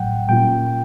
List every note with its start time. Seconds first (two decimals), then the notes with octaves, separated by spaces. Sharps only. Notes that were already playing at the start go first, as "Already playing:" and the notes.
Already playing: A1 A2 F#3 F#5 G5
0.29 A#2 G3 A#3 C#4 F4 G5